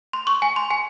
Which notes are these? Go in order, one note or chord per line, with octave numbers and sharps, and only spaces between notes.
C6
C#6
G#5
C6
G#5